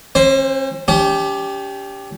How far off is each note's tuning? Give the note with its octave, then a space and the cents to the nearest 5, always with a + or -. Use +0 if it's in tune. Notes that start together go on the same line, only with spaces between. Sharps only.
C#4 -45 C5 +0
C#4 +45 G4 +5